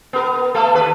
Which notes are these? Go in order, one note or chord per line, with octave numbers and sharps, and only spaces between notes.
B3 A#4
A3 A#3 A4
D#2 B4